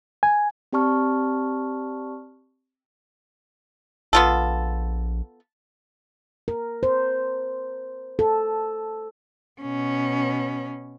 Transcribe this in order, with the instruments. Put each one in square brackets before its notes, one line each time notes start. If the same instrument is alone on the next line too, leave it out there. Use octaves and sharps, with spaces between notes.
[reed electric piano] G#5
[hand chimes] C4 G4 D5 A5 C#6 F6
[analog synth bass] A#1 [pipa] B3 F4 A4
[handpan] A#4
C5
A4
[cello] B2 C#4